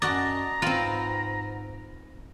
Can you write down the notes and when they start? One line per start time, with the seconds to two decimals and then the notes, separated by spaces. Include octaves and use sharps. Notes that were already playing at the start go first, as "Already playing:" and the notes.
0.02 F#2 F#4 D5 D#5 A5 A#5
0.62 G#2 C4 F4 B4 F5 G5